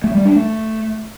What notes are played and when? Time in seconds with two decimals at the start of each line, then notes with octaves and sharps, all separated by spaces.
0.04 A3
0.15 G3
0.25 D4
0.36 A3